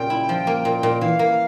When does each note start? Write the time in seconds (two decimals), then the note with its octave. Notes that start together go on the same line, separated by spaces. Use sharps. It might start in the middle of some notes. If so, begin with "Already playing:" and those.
Already playing: A#2 C#3 G3 C#4 G5
0.10 E4
0.29 F3
0.47 A#3
0.65 A#2
0.83 A#2
1.01 E3 F5
1.19 A#3